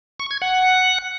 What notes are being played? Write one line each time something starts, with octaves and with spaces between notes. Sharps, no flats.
C#6
G#6
F#5